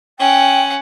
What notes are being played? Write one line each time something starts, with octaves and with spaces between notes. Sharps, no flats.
C#4 F#5 G5